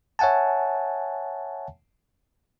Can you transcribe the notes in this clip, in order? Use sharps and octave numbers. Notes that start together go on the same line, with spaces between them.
C#5 E5 F#5 G#5 A5